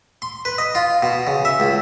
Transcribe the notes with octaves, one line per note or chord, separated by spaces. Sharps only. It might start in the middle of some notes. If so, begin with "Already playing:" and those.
C6
B4
D#5
F4
B2
C#3
E5
C#2